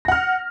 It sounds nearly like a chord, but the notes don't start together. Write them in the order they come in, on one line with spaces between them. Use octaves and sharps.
A#6 F#5 F6